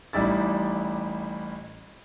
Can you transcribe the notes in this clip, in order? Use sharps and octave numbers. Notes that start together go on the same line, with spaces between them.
A1 G3 D#4 E4 A6